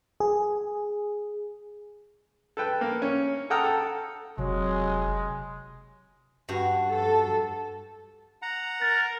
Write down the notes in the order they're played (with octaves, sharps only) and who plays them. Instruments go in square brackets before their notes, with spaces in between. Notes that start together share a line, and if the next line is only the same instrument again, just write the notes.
[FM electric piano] G#4
[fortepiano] A4 B4 G5
A#3
C#4
A4 F#5 G5 A#5 D#6 F6
A4
[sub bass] F1 [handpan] C3 [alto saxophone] F#3 [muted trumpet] G#3
[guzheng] G2 F#4
[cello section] A4
[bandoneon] F#5 A#5
[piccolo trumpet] A#4 [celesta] A6